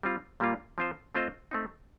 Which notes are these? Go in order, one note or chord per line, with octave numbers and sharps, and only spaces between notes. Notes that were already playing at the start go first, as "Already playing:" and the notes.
G3 C4 F4
A#2 G3 A#3 F4
F3 C4 F4 C5
A3 C4 F4 C5 D#5
A3 C4 D#4